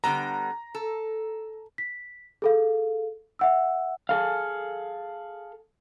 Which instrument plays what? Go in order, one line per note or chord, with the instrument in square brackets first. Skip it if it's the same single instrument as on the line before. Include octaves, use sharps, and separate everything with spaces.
[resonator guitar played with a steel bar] D3 G3 B3 [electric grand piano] A#5
[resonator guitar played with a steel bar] A4
[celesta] B6
G#4 A4 F5
E5 F#5 E6
[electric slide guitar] G#4 A4 F5